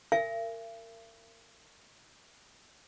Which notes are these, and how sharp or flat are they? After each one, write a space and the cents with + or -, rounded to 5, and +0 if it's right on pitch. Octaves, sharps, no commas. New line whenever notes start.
A#4 -30 E5 +45 G#5 +0